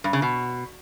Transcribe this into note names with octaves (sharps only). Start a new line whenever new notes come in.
G2
C#3
B2